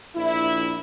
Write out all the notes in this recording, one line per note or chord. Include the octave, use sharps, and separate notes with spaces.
A#1 E4